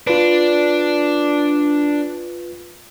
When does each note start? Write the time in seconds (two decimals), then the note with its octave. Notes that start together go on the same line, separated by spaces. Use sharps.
0.07 D4 F4 B4